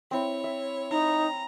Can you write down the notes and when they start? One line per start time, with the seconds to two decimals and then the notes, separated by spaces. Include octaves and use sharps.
0.11 C4 E4 C#5
0.44 E5
0.91 D#4 A#5